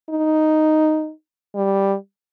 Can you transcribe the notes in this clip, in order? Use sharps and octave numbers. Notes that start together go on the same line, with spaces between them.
D#4
G3